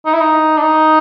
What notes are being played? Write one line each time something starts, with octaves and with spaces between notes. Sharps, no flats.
D#4
E4
D#4
D4
D#4